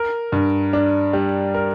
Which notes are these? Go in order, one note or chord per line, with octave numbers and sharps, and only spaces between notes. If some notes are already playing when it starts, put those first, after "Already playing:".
Already playing: A#4
G2
D4
G3
A#4